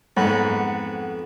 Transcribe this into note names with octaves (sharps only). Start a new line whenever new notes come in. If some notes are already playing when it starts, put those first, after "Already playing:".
F2 G#2 B3 F#5 B5